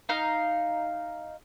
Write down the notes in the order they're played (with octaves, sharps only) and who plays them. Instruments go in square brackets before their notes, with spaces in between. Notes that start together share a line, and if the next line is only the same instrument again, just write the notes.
[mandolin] D#4 F5